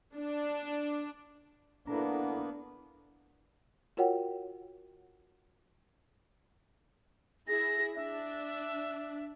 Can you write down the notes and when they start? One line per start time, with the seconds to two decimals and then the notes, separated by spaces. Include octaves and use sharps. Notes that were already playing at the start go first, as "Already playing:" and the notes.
0.16 D4
1.87 A#3 B3 D4 E4 A4 A#5
3.97 F4 F#4 A#4 C#5 F#5 G5
7.48 E4 G#4 A#6
7.96 D4 E5